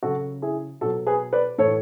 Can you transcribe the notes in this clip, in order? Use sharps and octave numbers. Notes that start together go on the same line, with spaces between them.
C#3 F#3 F#4 A4
E4 G#4
B2 F#3 F#4 A4
G#4 B4
B4 D5
A2 E3 A4 C#5